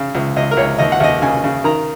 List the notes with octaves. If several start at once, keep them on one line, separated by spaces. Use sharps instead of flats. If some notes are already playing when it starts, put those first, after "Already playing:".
Already playing: C#3
C#2
C#2 D#5
A#4
C#2 C#5
D#2 D#5
F#5
D#2 D#5
C#3 G#5
C#3
D#3 A#5